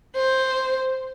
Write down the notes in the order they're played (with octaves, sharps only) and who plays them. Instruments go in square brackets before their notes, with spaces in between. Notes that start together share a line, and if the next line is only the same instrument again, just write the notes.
[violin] C5